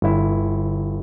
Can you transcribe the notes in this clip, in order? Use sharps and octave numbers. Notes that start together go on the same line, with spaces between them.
G1 E4